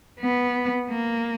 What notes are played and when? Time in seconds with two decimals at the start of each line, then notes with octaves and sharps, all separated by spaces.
0.19 B3
0.90 A#3